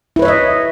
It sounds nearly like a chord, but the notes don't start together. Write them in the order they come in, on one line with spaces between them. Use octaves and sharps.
E4 B4 C#5 E5 D#5